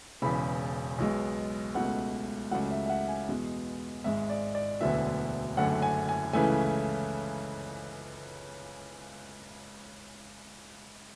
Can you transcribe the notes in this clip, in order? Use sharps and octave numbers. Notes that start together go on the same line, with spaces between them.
E1 E2 C#3 B5
B1 B2 G#3
C#2 B2 A3 F#5
C#2 C#3 F#3 A3 F#5
E5
E5
F#5
G#5
E2 B2 G#3 B3
G#1 G#2 G#3 E5
D5
D5
E1 D2 D3 F#3 B3 E5
F#1 F#2 D3 A3 F#5
G#5
G#5
C#2 C#3 E3 A3 G#5